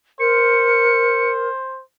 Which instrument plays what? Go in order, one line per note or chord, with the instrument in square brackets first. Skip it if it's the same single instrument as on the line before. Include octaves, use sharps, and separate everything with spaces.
[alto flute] A#4 [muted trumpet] C5 [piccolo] C#7